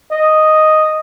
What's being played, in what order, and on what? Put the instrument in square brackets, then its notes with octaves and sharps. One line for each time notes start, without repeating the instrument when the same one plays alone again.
[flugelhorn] D#5